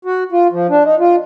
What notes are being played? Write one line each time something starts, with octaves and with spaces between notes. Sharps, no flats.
F#4
F4
F3
D4
D#4
F4